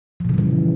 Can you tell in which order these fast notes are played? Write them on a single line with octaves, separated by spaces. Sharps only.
F3 A#2 C#3 G3 E3